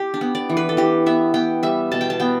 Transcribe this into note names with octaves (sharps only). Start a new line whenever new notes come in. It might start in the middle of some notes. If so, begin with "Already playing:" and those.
Already playing: G4
D4
B3
D5
E3
B4
A4
E3 G4
B3 E5
B3 G5
G3 E5
B2 A5
G5
A5
B3 G5